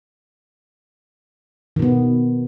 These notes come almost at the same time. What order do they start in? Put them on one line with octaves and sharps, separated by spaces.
D#3 B2 B3